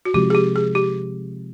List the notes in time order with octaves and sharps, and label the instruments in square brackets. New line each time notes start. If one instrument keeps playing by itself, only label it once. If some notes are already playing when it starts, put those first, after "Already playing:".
[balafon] F#4
[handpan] C3 F3 G#3 C4 D#4 [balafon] G4
[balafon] G#4
G4
G#4
G4